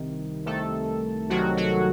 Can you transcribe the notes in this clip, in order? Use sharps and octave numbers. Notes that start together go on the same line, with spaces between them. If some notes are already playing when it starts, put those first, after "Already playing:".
Already playing: C2 C3 D#3
C2 C3 D#3 A3 A4
C2 C3 D#3 F#3 F#4
F#3 F#4